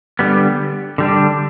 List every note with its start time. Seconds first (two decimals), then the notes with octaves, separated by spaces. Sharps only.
0.19 D3 G3 B3
0.98 D3 G3 D4